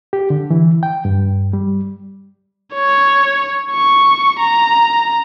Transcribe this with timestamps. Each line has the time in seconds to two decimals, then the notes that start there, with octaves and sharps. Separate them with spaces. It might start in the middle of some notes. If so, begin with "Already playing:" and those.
0.13 G4
0.30 D3
0.50 E3
0.83 G5
1.05 G2
1.53 G3
2.74 C#5
3.72 C#6
4.39 A#5